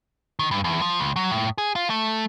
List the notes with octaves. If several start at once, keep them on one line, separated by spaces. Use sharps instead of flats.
D#3
G2
E2
F3
C#2
F#3
A2
G#4
F4
A3